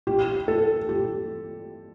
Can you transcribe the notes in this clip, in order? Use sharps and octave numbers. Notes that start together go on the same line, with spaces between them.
G4
A4
G4